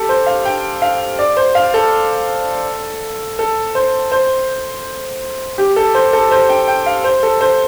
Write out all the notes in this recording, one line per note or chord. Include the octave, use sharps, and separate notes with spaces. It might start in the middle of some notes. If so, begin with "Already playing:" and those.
Already playing: G4 A4
C5
F5
G5
F5
D5
C5
F5
A4
A4
C5
C5
G4
A4
C5
A4
C5
G5
G5
F5
C5
A4
C5